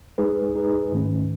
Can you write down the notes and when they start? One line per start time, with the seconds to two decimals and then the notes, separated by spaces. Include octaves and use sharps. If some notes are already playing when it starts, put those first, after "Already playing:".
0.18 G#3 D#4 G#4 B4
0.54 G#3 D#4 G#4 B4
0.92 G#2 D#3 A3 C#4